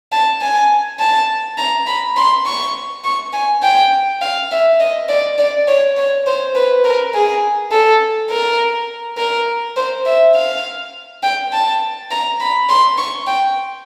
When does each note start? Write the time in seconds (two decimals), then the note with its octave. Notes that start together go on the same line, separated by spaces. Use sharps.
0.12 A5
0.41 G#5
1.00 A5
1.58 A#5
1.87 B5
2.17 C6
2.46 C#6
3.04 C#6
3.33 G#5
3.63 G5
4.22 F5
4.51 E5
4.80 D#5
5.09 D5
5.38 D5
5.68 C#5
5.97 C#5
6.26 C5
6.55 B4
6.85 A#4
7.14 G#4
7.72 A4
8.30 A#4
9.18 A#4
9.76 C5
10.06 E5
10.36 F5
11.23 G5
11.53 A5
12.11 A#5
12.40 B5
12.69 C6
12.98 C#6
13.27 G5